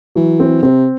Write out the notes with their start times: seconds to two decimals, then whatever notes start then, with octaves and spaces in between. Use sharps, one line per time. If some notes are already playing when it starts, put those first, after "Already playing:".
0.15 E3 F#3
0.40 C4
0.63 C3 C4